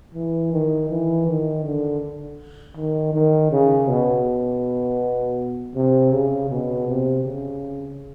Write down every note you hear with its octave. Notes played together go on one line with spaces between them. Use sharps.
E3
D#3
E3
D#3
D3
D#3
D#3
C#3
B2
C3
C#3
B2
C3
C#3